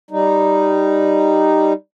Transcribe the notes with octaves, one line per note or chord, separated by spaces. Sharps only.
G3 D#4